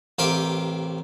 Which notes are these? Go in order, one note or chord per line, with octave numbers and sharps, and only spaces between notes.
A1 C3 A#4 F5 G5 D6